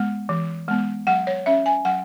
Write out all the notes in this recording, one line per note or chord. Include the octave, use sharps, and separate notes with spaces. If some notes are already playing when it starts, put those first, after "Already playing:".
Already playing: G#3 B3
E3
G#3 B3
F#3 F#5
C#5
C#4 E5
G#5
F#3 F#5